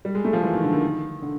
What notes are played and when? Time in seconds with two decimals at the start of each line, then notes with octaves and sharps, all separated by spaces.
0.05 G3
0.15 G#3
0.25 A3
0.33 F3
0.43 E3
0.53 D#3
0.64 D3
0.73 D#3
0.84 D#3
1.22 D3